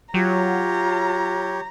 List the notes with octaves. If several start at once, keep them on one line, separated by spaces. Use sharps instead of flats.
F#3 F4 G4 C#5 A#5